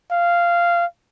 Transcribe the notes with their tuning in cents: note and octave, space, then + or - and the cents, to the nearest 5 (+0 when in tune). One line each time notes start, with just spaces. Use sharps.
F5 -10